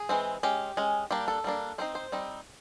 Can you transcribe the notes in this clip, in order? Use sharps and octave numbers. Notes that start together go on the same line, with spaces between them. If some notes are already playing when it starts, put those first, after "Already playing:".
Already playing: G#4
E3 G#3 C4
G#3 C#4 G4
G#3 C#4
G3 A#3 D4 G4
A4
G3 A#3 D4
G3 C4 D#4 C5
C5
G3 C4 D#4